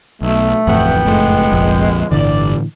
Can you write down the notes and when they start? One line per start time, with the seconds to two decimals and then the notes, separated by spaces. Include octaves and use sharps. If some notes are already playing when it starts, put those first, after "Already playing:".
0.22 B1 A3
0.67 D1 A1 F2 A2 B3 G5
1.05 F#1 G#3 A3
1.52 F1 A#1 F2
2.12 G1 A2 D3 E3 D5